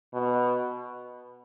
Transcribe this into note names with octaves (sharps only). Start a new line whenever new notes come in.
B2